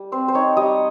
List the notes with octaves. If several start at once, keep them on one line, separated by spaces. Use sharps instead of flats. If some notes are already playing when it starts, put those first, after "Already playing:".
Already playing: G3
C4 C5
C5
D#4 C#5
G3 D#5